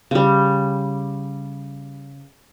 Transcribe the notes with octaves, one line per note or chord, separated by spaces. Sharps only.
C#3 G3